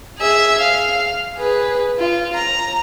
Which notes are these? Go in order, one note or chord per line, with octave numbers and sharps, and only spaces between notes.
G#4 E5
F5
G#4 B4
F4
A#5